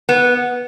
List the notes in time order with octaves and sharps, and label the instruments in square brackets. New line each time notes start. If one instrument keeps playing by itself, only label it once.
[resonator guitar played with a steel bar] B3